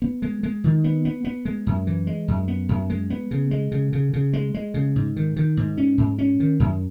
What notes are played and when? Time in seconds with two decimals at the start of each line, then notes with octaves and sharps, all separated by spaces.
0.02 B3
0.22 G#3
0.43 G#3
0.64 D#3
0.84 B3
1.05 B3
1.25 B3
1.45 G#3
1.66 F#2
1.87 E3
2.07 G#3
2.28 F#2
2.48 B3
2.69 F#2
2.90 G#3
3.10 B3
3.31 C#3
3.51 G#3
3.72 C#3
3.93 C#3
4.13 C#3
4.33 G#3
4.54 G#3
4.74 C#3
4.96 G#2
5.16 D#3
5.36 D#3
5.57 G#2
5.78 C#4
5.98 G#2
6.19 C#4
6.40 D#3
6.60 F#2